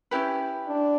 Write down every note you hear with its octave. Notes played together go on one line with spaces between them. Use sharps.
C#4 E4 G4 B4
D4